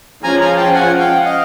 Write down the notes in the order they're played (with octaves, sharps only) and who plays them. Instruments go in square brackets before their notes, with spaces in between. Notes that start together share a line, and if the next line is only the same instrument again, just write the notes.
[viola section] F3 G#3 C#4 F4 [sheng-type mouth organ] G#5 A#5
[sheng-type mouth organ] G#5 A#5
G5 A5
F#5 G#5
F5 G5
F#5
D#5 F5